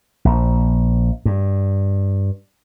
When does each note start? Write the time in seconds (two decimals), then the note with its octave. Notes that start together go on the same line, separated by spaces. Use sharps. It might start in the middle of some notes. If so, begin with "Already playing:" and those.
0.25 A#1
1.25 G2